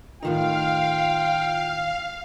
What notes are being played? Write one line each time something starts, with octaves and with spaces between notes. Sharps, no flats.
A2 D#3 D#4 F4 F5 G5